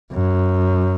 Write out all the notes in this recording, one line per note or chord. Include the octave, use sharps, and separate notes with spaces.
F#2